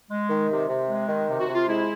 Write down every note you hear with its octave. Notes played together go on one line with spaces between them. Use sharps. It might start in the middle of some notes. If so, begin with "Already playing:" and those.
G#3
D#3
C3
C3
G#3
D#3
C3
F#4
C3
F4
G#3 E4